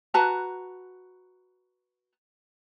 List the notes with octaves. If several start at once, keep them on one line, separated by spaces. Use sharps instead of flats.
F#4 B4 A5 A#5